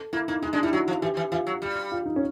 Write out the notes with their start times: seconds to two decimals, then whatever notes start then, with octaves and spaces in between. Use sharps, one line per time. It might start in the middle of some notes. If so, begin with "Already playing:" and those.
Already playing: A4
0.13 A#3 E4
0.28 A#3 D#4
0.42 G#3 D#4
0.53 G#3 D4
0.63 G3 E4
0.73 F#3 F#4
0.88 F3
1.02 E3 G4
1.17 E3
1.32 E3 F4
1.47 F#3
1.62 G3
1.92 F4
2.06 D#4
2.16 C#4